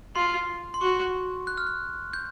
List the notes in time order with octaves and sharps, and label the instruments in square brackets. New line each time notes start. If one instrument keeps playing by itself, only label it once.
[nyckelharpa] F4 [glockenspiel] C6
[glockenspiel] C6
[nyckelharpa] F#4 [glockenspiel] C#6
[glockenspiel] F#6
F6
F#6
G6